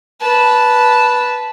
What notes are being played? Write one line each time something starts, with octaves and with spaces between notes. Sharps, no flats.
B4 A5